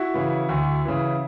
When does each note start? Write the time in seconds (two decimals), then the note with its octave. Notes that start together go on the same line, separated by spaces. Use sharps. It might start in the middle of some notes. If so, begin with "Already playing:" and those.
Already playing: E4 F#4
0.14 C#3 E3
0.49 D2
0.85 C#3 E3